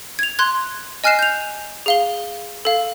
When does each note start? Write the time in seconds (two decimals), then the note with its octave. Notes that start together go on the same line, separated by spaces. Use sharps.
0.19 G#6 F7
0.39 C6 F#6 G#6
1.04 D#5 G#5 F6 F#6 C7 E7
1.19 G6 F7
1.86 G#4 F5 G7
2.65 A4 F5